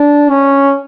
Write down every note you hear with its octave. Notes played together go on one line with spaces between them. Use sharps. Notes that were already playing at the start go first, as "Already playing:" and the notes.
Already playing: D4
C#4